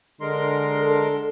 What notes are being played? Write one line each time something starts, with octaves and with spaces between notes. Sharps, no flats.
D3 G#3 A#4 C6
A4